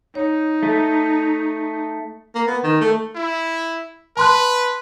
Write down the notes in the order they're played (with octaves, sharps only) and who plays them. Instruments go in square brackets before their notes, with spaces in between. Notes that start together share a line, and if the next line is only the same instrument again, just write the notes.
[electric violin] D#4 [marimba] C#5
[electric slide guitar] A3
[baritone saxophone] A#3
B3
D#3
A3
[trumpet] E4
[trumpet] B4 [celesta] A5 C6 F#6